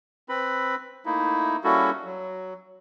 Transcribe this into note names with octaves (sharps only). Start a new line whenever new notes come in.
C4 B4 B5
A3 A#3 D#4 E4
G3 A#3 C#4 E4 F#4 A4
F#3